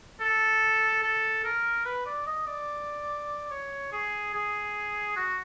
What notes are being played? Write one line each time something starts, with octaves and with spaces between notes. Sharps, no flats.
A4
A4
A#4
B4
D5
D#5
D5
C#5
G#4
G#4
F#4